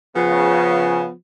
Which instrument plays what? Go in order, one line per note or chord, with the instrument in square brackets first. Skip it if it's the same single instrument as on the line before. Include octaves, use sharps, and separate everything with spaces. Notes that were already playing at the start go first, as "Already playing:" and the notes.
[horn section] C#3 [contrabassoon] F3 [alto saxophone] B3